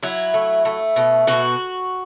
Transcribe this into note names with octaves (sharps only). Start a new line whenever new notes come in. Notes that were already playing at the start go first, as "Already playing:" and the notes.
F#3 E4
A3
A3
B2
B2 F#4